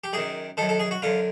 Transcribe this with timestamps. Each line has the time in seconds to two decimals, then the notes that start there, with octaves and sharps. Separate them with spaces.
0.04 G4
0.13 F#2 D#3 G#4
0.57 D#3 A4
0.61 F#2
0.69 A4
0.79 G#4
0.91 F#4
1.02 F#2 D3 F4